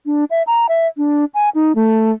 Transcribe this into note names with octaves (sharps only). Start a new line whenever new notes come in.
D4
E5
A#5
E5
D4
G#5
D#4
A3